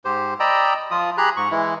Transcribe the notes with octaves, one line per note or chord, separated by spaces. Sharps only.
G#2 G4 C5
D5 D#5 G5 A#5 B5 E6
F3 F4 D#6
G4 G#4 A#5 B5 F#6
G#2 C#6
E3 G#3 E4